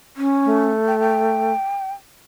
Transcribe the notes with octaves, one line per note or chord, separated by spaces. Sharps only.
C#4
A3
G5
G5